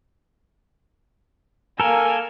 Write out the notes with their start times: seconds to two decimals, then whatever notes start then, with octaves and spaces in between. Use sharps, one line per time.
1.80 A#3 A4 A#4 G#5